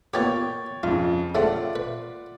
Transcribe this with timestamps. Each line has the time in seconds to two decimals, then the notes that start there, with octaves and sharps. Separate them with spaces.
0.14 A#2 B3 G4 C#5 G5 A6
0.83 F2 C#3 F4
1.35 C#3 A3 C4 F4 D5 F#5
1.76 B4